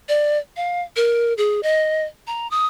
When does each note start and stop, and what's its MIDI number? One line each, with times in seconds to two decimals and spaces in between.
0.09 0.38 74
0.57 0.82 77
0.96 1.33 70
1.38 1.61 68
1.63 2.04 75
2.27 2.50 82
2.51 2.66 87